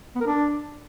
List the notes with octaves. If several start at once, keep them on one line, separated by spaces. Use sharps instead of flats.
B3
A#4
D4